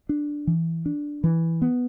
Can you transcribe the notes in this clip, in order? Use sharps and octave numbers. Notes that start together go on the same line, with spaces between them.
D4
E3
D4
E3
B3